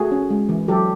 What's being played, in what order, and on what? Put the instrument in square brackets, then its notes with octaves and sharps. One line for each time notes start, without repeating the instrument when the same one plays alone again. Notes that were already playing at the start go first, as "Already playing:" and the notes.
Already playing: [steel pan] A3 F#4 G#4
C#4
G#3
E3
F#3 G4 A4